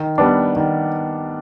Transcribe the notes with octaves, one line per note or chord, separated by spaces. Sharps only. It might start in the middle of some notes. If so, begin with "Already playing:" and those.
Already playing: D#3
G3 B3 D4
D#3